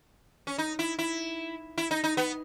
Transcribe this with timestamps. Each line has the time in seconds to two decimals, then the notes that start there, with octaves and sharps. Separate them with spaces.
0.47 C#4
0.58 D#4
0.79 E4
0.99 E4
1.78 E4
1.91 D#4
2.04 D#4
2.17 B3